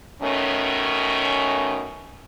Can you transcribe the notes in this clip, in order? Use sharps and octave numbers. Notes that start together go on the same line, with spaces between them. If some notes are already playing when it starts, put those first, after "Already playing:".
B2 D#3 A3 C#4